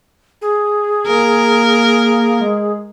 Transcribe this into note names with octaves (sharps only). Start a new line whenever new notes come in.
G#4
A#3 A#4
G#3